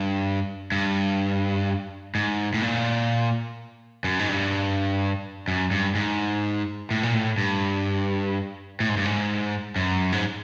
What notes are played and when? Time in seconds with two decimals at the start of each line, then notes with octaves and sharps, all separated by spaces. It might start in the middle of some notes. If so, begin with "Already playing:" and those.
Already playing: G2
0.72 G2
2.15 G#2
2.54 A2
2.62 A#2
4.04 F#2
4.19 G#2
4.29 G2
5.48 F#2
5.71 G2
5.95 G#2
6.91 A2
7.03 A#2
7.14 A2
7.38 G2
8.80 A2
8.89 G#2
8.97 G2
9.05 G#2
9.76 F#2
10.12 G#2